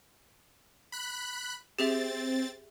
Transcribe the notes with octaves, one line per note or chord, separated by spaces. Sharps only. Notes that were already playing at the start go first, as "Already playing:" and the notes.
B5 F#6
C4 G4 G#4 E5 A6